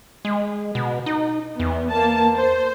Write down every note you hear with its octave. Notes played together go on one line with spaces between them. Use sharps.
G#3
B2
D#4
E2 B3
A#3 A5
C5